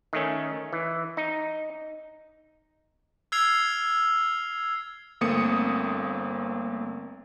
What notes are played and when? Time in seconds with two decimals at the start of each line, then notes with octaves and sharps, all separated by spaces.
0.13 D#3 A3 C#4
0.73 E3
1.17 D#4
3.32 E6 F6 G#6 C7 F7
5.21 G1 A3 A#3 C4 D#6 C#7